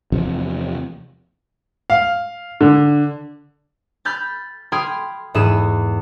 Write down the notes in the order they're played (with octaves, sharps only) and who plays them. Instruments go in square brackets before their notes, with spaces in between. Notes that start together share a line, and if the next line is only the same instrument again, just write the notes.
[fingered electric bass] E2 C3 F3
[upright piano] F5
D3
[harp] B5 F6 G6 A6
G5 B5 C6 D#6 F6 G#6
E2 G#2 E4 G#4 B5 E7